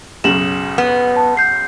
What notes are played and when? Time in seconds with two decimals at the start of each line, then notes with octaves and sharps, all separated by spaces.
0.24 B1 F#2 C#3 E7 F#7
0.78 B3
1.16 A5
1.37 G6 C7